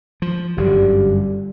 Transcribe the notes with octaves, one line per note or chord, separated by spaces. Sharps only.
F3
G1 F#2 D3 G3